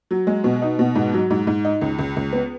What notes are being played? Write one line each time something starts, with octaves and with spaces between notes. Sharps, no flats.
F#3
G#3
B2
D#4
B2
G#2
F#3
G#2
G#2
D#4
C#2
C#2
C#2
B3